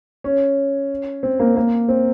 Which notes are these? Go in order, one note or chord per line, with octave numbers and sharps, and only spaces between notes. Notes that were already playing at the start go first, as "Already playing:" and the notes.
C#4
C4
A#3
A#3
C4